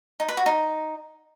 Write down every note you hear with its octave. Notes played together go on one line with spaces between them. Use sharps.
D#4
B4
F#4
D#4